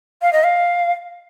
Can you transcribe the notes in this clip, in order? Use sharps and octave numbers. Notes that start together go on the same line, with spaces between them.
F5
D#5
F5